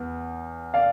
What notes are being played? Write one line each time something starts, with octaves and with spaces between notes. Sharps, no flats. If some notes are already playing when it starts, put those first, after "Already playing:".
Already playing: E2 B3
D5 F5